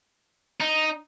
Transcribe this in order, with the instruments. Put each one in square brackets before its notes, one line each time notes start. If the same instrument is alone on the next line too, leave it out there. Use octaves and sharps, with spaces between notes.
[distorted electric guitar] D#4